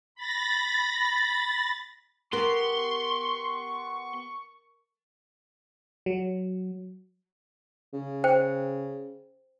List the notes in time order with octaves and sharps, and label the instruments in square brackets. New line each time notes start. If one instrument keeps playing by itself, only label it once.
[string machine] B5 A6 A#6
[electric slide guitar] B3 G4 [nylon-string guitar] A#4 [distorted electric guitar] C6 [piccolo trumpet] C#6
[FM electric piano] F#3
[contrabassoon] C#3
[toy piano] C5 G5